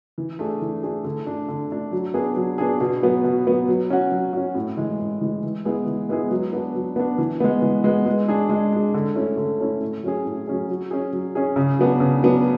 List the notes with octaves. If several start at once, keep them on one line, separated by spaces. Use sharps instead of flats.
E3
A3 D4 G#4
E3
A3 D4 G#4
D3
A3 D4
D3
A3 D4
F#3
B3 D4 G#4
F#3
B3 D4 G#4
B2
F#3 B3
B2
F#3 B3
F#3
C#4 F#4
F#3
C#4 F#4
A2
E3 G#3
A2
E3 G#3
E3
G#3 B3 E4 G#4
E3
G#3 B3 E4 G#4
F#3
B3 D4
F#3
B3 D4
E3
G#3 B3
E3
G#3 B3
G#3
D4 G#4
G#3
D4 G#4
D3
A3 C#4 E4
D3
A3 C#4 E4
A2
F#3 C#4 G#4
A2
F#3 C#4 G#4
F#3
C#4 G#4
F#3
C#4 G#4
C#3
F#3 B3 D4
C#3
F#3 B3 D4